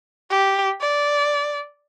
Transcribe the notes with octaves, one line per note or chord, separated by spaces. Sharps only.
G4
D5